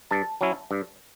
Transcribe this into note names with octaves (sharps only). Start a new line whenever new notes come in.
G2 A5
F#3 C#4 E4
G2